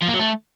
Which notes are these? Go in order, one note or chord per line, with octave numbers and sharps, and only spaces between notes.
F3
A#3
F#3
A3